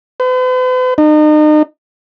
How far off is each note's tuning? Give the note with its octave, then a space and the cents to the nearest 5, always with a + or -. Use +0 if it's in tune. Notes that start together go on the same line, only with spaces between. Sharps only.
B4 +45
D#4 -35